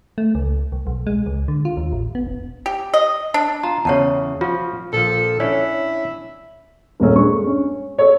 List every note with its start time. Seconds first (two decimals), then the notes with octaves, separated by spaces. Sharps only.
0.18 A3
0.35 C#2
0.72 C2
0.87 B1
1.07 G#3
1.26 C#2
1.48 D3
1.65 F4
1.77 D#2
1.92 A1
2.15 B3
2.27 E1
2.66 G4
2.94 D#5
3.34 D4
3.63 F4 A#5
3.85 E2 C#3 C#5 F#5 A5
4.41 F3 F4 F#4
4.93 A#1 F3 A4
5.40 C#4 D4 E4 C#5
7.00 D#1 F#2 A#3 C#4 A4
7.16 G#3 D4 C#6
7.46 C#4
7.98 A4 C#5